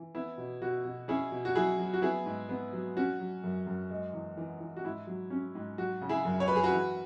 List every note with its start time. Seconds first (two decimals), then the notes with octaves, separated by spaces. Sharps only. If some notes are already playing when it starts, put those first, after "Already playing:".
Already playing: E3
0.15 B3 E4
0.38 B2
0.61 B2 F#4
0.85 B2
1.08 C#4 E4 G#4
1.32 B2
1.45 F#4
1.55 F#3 E4 G#4
1.79 F#3
1.94 F#4
2.02 B3 E4 G#4
2.26 G#2
2.49 B3
2.73 F#3
2.97 C#4 F#4
3.20 F#3
3.44 F#2
3.67 F#2
3.90 G#3
4.13 E2
4.37 E3
4.60 E3
4.77 F#4
4.84 G#2 E4
5.07 F#3
5.30 C#4
5.55 G#2
5.78 F#3 F#4
6.01 C#3
6.09 E4 G#4
6.25 F#2
6.40 C#5
6.48 F#3 B4
6.56 G#4
6.63 F#4 B4
6.72 E3